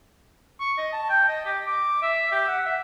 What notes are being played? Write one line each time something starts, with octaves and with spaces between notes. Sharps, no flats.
C#6
D#5
A5
G5
D#5
G4
D6
E5
G4
F#5
E5